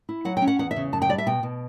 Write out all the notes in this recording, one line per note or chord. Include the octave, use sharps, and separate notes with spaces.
E4
F#3 F#5
G5
C#4
F#5
E2 F#5
E5
C#3
F#2 A5
G5
G3 D5
E5
B2 G5
B2